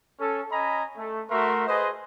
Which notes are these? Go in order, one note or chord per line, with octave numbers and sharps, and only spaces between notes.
C#4 A4
C#4 D#5 G#5 A#5 B5
A3
A3 F#4 A#4 E5 C6
G#4 B4 C5 D#5